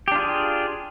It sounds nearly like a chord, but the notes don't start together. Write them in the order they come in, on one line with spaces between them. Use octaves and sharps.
G4 D4 F4 G#4